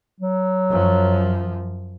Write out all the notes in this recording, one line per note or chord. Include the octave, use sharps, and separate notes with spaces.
F#3
F#2 F3